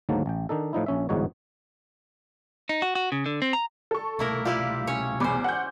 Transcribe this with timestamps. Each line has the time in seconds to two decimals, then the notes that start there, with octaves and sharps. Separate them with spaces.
0.09 D2 G#2 D#3 F#3 A#3 A5
0.26 A1 G5
0.49 D#3 D4 D#4 A4
0.73 A2 F3 D#4 E4
0.86 A#1 C#4 E5
1.09 G1 E2 G#2 D#4 F#4 C#5
2.69 D#4
2.82 F#4
2.95 F#4
3.12 C#3
3.26 D3
3.42 C4
3.53 A#5
3.91 A4 C#6
4.19 C2 B2 A3 A#3 E4 A#4
4.45 G3 E4 F4 G4
4.87 C#4 C#5
5.20 E2 C#4 C5 B5 D6
5.44 F#5 G6